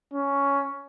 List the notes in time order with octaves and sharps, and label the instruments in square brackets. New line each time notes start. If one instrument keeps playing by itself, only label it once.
[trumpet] C#4